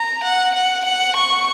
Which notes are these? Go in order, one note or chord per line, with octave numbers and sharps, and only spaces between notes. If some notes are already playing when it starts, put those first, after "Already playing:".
Already playing: A#5
F#5
F#5
F#5
C#6